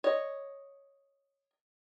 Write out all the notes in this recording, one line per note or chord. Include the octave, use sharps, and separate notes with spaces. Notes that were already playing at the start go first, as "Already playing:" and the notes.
C#5 D#5